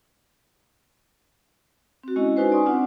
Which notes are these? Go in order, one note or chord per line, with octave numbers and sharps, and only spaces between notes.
C4 F#4
G#3 C#4 E4 D#5
C#4 D#4 F#4 B4 C5 G#5
D5 G#5 C6 C#6 D#6
C4 D4 F4 F#5